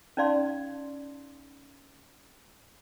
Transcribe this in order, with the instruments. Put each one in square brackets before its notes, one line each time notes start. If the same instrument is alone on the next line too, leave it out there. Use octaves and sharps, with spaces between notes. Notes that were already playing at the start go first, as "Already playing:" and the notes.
[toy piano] C#4 D#4 D5 F5 C6